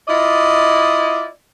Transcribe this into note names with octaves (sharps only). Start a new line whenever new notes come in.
E4 F4 D5 D#5